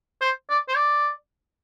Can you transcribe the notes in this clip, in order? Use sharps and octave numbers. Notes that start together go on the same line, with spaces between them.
C5
D5
C5
D5